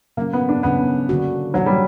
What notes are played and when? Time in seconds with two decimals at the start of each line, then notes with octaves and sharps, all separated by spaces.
0.17 C#3 F#3 A#3 C#4
0.33 B3
0.49 D4
0.63 C#3 F#3 B3 C#4
1.09 D3 A#3 D4 F#4
1.54 D3 F#3 A#3 D4 F#4
1.66 G3